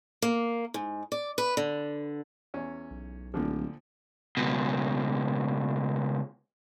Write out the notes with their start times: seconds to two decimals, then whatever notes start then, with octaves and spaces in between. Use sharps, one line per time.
0.22 A#3
0.74 G#2
1.12 D5
1.38 B4
1.57 D3
2.54 E2 C#4
2.91 B1
3.34 D1 A#2 D3 F3
4.37 C#2 B2